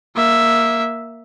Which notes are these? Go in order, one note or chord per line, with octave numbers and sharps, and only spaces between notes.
A#3 E5